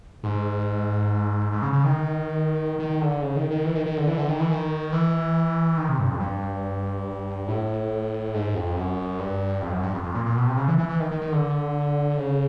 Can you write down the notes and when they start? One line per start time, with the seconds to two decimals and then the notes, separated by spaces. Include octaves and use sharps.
0.23 G#2
1.52 G#2
1.62 C#3
1.73 C#3
1.84 D#3
2.79 D#3
3.01 D3
3.22 C#3
3.37 D#3
3.50 D#3
3.65 E3
3.75 D#3
3.86 D#3
3.97 D3
4.07 E3
4.17 D3
4.29 D#3
4.40 E3
4.51 D#3
4.92 E3
5.78 D#3
5.89 C3
5.99 G2
6.10 F2
6.20 G2
7.48 A2
8.34 G#2
8.54 F2
8.77 F#2
9.19 G2
9.62 F2
9.72 F#2
9.83 G2
9.93 F2
10.04 F2
10.15 A#2
10.26 A#2
10.37 B2
10.47 C3
10.57 C#3
10.68 E3
10.78 E3
10.89 E3
11.00 D#3
11.11 D#3
11.21 D#3
11.32 D3
12.17 C#3